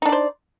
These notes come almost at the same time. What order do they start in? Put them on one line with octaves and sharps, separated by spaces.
D#4 D4 D5 C5